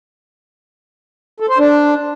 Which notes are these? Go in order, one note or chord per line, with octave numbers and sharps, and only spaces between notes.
A4
C5
D4